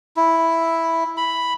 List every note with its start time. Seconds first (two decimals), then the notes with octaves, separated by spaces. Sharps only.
0.16 E4
1.17 B5